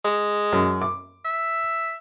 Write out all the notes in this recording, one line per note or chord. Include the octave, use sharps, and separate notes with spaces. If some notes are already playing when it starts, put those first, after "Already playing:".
G#3
F#2
D6
E5